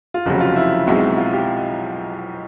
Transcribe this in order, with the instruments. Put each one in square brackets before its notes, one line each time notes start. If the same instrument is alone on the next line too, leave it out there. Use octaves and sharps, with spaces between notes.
[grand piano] F4
[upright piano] F1 F2 C#3 F#3 [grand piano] F#4
[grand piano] F4
E4
[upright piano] B1 B2 G#3 C4 D#4
[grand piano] F4
G4